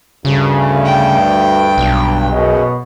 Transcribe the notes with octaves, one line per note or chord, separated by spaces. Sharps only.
D2 G2 C#3
G5
B1
F#2 B2 G#4 D#5